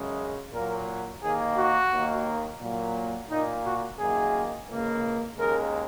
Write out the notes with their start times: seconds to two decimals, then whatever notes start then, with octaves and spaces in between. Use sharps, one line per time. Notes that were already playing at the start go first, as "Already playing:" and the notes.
Already playing: F#2 C#3 G#3
0.53 A#2 F#3 A#3 A#4
1.23 D#2 D#3 A#3 G#4
1.57 F#4
1.92 D#2 D#3 A#3
2.61 A#2 F#3 A#3
3.29 A#2 A#3 D#4
3.65 F#4
3.99 F#2 D#3 A#3 G#4
4.68 C#2 C#3 A#3
5.37 D#2 C#3 G#3 A#4